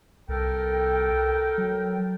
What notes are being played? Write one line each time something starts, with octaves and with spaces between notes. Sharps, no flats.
C2 A4 A#4 G5
F#3